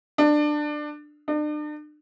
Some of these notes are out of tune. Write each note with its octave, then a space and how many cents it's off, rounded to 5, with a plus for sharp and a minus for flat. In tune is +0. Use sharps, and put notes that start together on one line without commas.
D4 +20
D4 +40